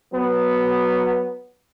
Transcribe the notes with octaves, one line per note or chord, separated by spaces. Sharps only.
F#3 B3